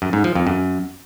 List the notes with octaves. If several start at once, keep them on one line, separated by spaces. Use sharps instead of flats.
F#2
G#2
F3
F2
F#2